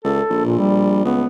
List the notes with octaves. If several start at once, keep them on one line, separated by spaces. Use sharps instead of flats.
C#2 A4
A#1
A#2
G3
C#2 B3